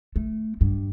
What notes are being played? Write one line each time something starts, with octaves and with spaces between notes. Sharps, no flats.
A3
G2